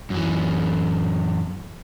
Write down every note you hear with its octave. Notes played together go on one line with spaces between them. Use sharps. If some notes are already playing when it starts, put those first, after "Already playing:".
F#2 E3